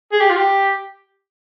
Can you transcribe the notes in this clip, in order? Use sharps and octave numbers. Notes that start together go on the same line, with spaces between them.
G#4
G4
F4
G4